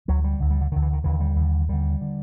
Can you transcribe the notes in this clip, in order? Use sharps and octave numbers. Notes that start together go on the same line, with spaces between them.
D2 D3 F#3
G3
D2 D3
G3
D3
D2 D3 D#3
E3
D#3
D#2 D3 E3
G3
D#2
D3
D#2 D3 G3
D3